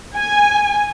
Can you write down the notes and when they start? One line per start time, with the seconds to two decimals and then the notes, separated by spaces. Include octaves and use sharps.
0.18 G#5